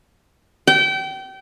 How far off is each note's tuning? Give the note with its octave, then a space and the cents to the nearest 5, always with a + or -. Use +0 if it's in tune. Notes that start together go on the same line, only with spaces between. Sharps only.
G5 -30